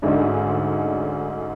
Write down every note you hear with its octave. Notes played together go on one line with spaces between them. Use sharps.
D2 G#2 G#3 C#4 D4